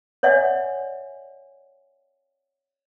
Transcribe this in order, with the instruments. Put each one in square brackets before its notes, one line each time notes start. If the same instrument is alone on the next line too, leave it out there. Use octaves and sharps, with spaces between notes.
[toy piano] C#5 D5 E5 F#5 G#5